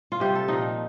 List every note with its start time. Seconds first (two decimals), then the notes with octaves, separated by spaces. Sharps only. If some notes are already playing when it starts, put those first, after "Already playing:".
0.12 F4
0.20 C3 G3 G4
0.35 A4
0.48 A#2 F3 D#4